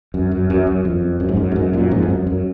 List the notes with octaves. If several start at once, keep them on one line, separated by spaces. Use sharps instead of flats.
F#2
F#2
F#2
F#2
F2
F#2
G#2
F#2
G#2
F#2
F#2 A#2
F2 G#2
G#2
F#2
F#2